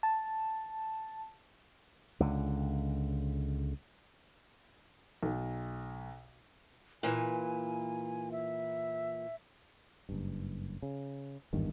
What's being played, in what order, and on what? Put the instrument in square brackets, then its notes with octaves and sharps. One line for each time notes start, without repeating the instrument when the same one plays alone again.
[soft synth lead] A5
[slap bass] C#2 D3
[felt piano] B1
[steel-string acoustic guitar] A#2 E3 [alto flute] G#5
[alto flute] E5
[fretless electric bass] F#1 G2
C#3
G#1 E2 G2 D#3